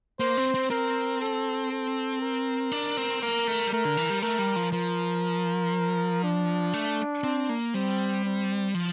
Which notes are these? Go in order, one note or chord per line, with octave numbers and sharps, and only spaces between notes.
A#3 C5
C4
C4
C4 A#4
A4
A4
A#4
D4
C4
A#3 A#4
A3
G3
A3 A#4
D3
E3
G3
A3 A#4
G3
F3
F3 A#4
D4
A3
C4
A#3
G3 C4
C4
F3